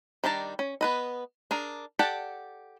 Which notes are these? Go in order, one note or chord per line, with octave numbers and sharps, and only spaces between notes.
D#3 G3 D4 A5 A#5
C#4
B3 B4 D#5
D4 G#4 A#4
G4 A4 D5 F#5 A5